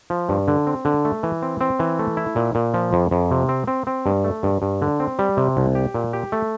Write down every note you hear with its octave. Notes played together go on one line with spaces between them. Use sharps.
F3
G2
D3
C4
D3
A3
E3
C4
C4
E3
A3
E4
A#2
A#2
F3
F2
F2
C3
C4
C4
C4
G2
A3
G2
G2
D3
C4
G3
C3
C2
G4
A#2
G4
A3